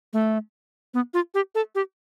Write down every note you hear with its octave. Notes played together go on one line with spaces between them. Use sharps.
A3
B3
F4
G4
A4
G4